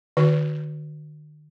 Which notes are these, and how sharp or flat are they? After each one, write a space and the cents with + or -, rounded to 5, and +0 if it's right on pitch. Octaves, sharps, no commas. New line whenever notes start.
D#3 -45 F#4 +0 B4 +0